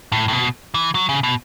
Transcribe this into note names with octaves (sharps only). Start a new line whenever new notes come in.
A2
A2
B2
E3
F#3
C#3
B2